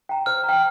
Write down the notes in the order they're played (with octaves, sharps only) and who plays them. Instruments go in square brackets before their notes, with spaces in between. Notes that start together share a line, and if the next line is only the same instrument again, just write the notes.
[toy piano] G5 A#5
[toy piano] C5 [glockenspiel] F6
[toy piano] A#5
G5